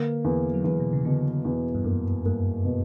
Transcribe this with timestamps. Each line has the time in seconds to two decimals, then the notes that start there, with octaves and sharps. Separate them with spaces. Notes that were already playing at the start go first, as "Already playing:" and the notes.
Already playing: D3 A#3
0.24 E2
0.54 F#3
0.64 E2 E3
0.80 B2
0.93 C#3
1.05 B2 D3
1.45 E2
1.75 G2
1.84 F#2 A#3
2.25 G2 A#3
2.65 B2